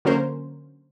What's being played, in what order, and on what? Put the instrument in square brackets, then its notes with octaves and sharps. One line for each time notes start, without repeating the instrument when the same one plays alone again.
[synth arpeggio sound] D3 F#3 A#3 C#4 A#4 C5